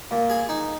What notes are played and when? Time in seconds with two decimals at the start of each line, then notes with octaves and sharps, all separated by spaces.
0.11 A#2
0.30 G#4
0.49 D#4